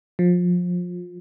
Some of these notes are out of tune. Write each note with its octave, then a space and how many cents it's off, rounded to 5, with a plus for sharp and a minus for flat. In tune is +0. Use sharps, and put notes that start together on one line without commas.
F3 +25